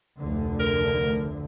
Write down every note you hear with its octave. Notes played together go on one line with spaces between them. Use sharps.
F1 D2 D3
A#4